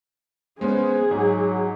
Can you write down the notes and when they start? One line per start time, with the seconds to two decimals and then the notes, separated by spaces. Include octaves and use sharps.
0.61 G#3 B3 C#4 G#4 C5
1.11 G#2 F#3